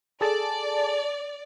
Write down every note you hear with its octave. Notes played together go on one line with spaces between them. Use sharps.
G#4 A4 D5 A5